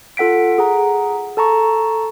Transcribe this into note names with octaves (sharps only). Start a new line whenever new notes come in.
F4 A4 F#5 B6 D7
G#4 F#5 A#5
A4 A5 A#5 C#6